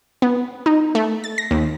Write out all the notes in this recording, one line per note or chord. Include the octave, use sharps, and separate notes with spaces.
B3
D#4
A3
A6
A#6
D#2